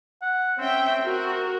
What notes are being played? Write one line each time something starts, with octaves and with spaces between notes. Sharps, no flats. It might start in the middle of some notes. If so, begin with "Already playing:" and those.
F#5
C4 C#4 E5 G5
F#4 A#4